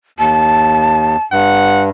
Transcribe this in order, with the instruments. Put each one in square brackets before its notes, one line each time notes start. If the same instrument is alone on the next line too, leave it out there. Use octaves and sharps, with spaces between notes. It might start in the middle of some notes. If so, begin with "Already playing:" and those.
[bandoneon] D#2 [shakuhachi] A5
[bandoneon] G2 [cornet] F#5